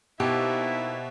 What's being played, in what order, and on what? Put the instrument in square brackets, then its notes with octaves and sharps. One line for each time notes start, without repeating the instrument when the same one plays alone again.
[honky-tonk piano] B2 [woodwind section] A#3 D#4 E4 [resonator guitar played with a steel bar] G4 [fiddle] C5 E5